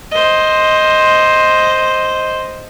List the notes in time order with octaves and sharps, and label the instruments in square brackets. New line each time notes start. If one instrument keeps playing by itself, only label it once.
[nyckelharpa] C5 D#5